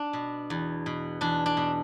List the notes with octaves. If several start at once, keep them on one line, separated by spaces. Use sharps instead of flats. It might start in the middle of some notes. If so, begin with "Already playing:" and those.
Already playing: D4
B2
E2
B2
E2 D4
D4
B2